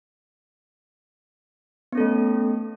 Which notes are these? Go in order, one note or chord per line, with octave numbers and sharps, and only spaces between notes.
A3 B3 C#4 A4